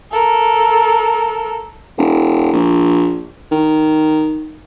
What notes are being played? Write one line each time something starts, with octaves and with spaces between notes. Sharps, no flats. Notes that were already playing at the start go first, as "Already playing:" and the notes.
A4 A#4
E1
A#1
D#3